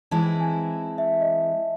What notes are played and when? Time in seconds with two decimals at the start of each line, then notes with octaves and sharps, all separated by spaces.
0.11 E3 G#3 C4 E4 A5
0.40 G#5
0.98 E5
1.21 D#5
1.43 E5